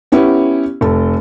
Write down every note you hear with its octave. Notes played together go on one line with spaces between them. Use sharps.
B3 C#4 E4 G4
F1 A4